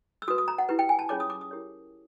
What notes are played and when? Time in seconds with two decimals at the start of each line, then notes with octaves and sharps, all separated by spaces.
0.22 E6
0.28 F#4 B4 D#6
0.38 D#6
0.48 A#5
0.58 F#5
0.69 E4 G4 B4
0.79 G5
0.89 G#5
0.99 A5
1.09 C#4 F4 G#4 C#5 D6
1.20 D#6
1.30 D6
1.41 D#6
1.51 E4 G4 A#4 C#5